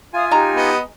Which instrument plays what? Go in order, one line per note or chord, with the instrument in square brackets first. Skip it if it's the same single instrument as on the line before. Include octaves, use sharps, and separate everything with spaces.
[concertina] F4 G#5 [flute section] E5 F5 D#6
[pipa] G#3 A#5 [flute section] D#4 G4
[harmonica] B3 D#5